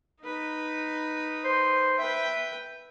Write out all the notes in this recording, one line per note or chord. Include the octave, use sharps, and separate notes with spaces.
D#4 B4
C5
B4 E5 G5